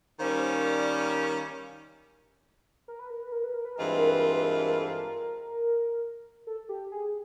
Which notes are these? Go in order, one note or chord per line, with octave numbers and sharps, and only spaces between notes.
D#3 G3 A#3 C#4 C5
D5
A#4
B4
A#4
B4
A#4
B4
A#4
B4
G2 E3 G#3 C4 F4 A#4
B4
A#4
B4
A#4
B4
A#4
A#4
A4
A#4
A4
G4
G#4